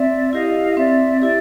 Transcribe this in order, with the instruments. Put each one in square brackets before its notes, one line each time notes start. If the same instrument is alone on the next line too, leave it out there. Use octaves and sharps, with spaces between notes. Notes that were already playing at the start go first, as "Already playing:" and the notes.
Already playing: [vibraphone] C4 [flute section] D5 E5
[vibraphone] E4 G4 [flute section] D#5 F5
[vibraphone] C4 [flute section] D5 E5
[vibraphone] E4 G4 [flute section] D5 E5